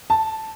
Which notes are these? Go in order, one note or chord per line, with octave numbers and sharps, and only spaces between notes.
A5